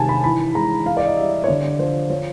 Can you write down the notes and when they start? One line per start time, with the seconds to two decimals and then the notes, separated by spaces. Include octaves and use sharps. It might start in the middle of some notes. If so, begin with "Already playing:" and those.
Already playing: C3 D#3 G#3 G#5 A5
0.09 B5
0.24 E3 B5
0.55 G#3 A#5
0.86 E3 F5
0.97 D5
1.07 D#5
1.17 G3 E5
1.44 C#5
1.48 D3 D5
1.79 F3 C5
2.10 F3 C#5